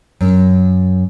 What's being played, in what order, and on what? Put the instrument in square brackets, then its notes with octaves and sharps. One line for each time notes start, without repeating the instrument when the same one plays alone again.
[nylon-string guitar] F#2